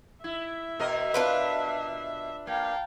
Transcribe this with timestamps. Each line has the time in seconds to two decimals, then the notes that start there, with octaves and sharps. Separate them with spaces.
0.24 E4 E5
0.79 B2 A#4 D#5
1.14 D4 F4 B4
2.47 A#3 F5 G5 A5